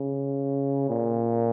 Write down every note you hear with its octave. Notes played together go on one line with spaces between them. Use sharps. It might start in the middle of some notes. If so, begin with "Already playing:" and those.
Already playing: C#3
A#2